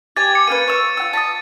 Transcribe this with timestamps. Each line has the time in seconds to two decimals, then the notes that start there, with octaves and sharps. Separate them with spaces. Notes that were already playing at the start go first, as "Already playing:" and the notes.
0.16 G4 G#5 A6
0.35 C#7
0.47 A#3 C#4 B4 D#7
0.68 C#5 E6
0.97 F4 F#4 E6
1.13 A5 B5 D#6